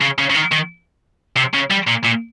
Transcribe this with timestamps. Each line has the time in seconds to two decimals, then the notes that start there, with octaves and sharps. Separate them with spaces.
0.01 C#3
0.19 C#3
0.30 C#3
0.35 D#3
0.52 D#3
1.37 C3
1.54 C#3
1.71 G3
1.88 A#2
2.05 A#2